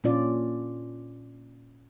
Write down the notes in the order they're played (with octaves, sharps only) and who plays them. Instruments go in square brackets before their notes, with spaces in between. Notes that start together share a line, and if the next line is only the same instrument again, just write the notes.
[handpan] A#2 C#4 F4 D5